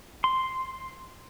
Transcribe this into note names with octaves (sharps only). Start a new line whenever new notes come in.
C6